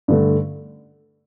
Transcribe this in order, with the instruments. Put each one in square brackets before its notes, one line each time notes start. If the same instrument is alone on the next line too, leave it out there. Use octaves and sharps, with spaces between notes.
[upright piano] G2 D3 A3